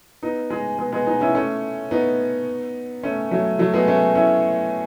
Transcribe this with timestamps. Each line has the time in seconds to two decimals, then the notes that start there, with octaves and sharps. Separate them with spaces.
0.22 B3 D#4
0.50 G#3
0.78 G#3 B3
0.92 G#3 B3
1.07 B3 D#4
1.21 C#4 E4
1.35 A3 C#4
1.91 B3 D#4
3.03 A3 C#4
3.31 F#3 A3
3.59 F#3 A3
3.74 G#3 B3
3.87 A3 C#4
4.15 C#4 E4